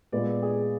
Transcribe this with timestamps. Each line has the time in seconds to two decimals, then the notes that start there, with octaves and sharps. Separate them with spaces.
0.12 A#2 G#3 B3 D5
0.42 G#4